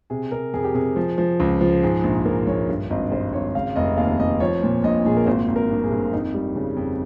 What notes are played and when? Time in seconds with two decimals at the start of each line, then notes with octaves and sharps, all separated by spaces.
0.10 C3 G#4
0.32 C3 A#4
0.54 F2 G#4
0.64 G4
0.74 C3 G#4
0.96 F3
1.18 F3
1.40 C#2
1.61 F3
1.83 G#2 G#4
2.04 A#1
2.25 A#1 A#4
2.46 A#1 C#5
2.68 G2
2.90 G#1 D#5
3.12 G2 C5
3.33 G#1 C#5
3.55 C#3 F5
3.76 F1 D#5
3.97 D#2 F5
4.20 F1 D#5
4.40 F3 C#5
4.63 A#2
4.84 A#1 D#5
5.05 A#2 G#4
5.17 A#4
5.26 G#1 C5
5.48 G#1
5.56 A#4
5.70 G2
5.84 G#4
5.91 G2
6.12 F2 D#4
6.34 G3
6.56 C#3
6.77 F2